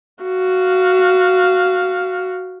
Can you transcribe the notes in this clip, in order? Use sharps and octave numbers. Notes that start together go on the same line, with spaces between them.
F#4 F5